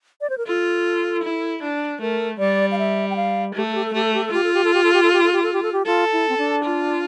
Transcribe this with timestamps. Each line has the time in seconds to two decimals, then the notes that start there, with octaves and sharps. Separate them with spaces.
0.21 D5
0.30 C5
0.38 A#4
0.47 F4 A4
1.23 E4
1.62 D4
2.01 A3 A#4
2.39 G3 D5
2.72 F5
2.79 E5
3.10 G5
3.16 F5
3.55 A3 G4
3.65 A4
3.75 G4
3.85 A4
3.93 A3 G4
4.04 A4
4.14 G4
4.24 A4
4.32 F4 G4
4.44 A4
4.54 G4
4.64 A4
4.74 G4
4.84 A4
4.93 G4
5.03 A4
5.13 G4
5.24 A4
5.33 G4
5.43 A4
5.53 G4
5.63 A4
5.73 G4
5.86 F4 A4
6.13 E4
6.29 C4
6.38 D4
6.64 F4